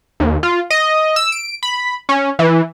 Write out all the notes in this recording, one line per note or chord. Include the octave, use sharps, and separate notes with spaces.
D#2
F4
D#5
E6
D7
B5
C#4
E3